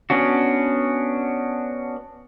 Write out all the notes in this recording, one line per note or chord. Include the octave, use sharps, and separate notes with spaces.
B3 C#4 D4 F#4